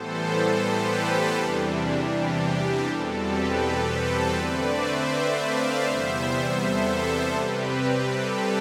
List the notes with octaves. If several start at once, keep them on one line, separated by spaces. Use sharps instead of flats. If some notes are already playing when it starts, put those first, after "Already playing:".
Already playing: A2 E3 G3 B3 A4 C5
G4 B4
A4
E2 C3 E3 G3 D4
G4
G4
E2 B2 G3 C4 A4
G4 B4
A4 C5
D3 A3 C4 B4 D5
C5 E5
D5 F5
E2 C3 G3 B3 C5 E5
A4 C5
C3 G3 C4 G4 B4
G4
A4